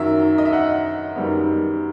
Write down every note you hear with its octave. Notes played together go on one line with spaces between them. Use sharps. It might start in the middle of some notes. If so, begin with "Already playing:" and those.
Already playing: F#2 D#3 F#3 E5
D#5
E5
F#5
F#2 D#3 G3 B3